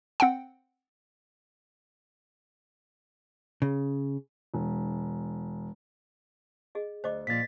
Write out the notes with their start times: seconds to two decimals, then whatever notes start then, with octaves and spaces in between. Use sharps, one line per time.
0.20 C4 F#5 G5
3.62 C#3
4.54 E1
6.75 G#4 D#5
7.04 D2 C5 D#5 D6
7.27 A#2 F3 A6 B6